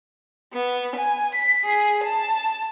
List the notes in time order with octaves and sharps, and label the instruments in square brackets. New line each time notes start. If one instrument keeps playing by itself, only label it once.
[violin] B3
G#5
B6
G#4 C7
A5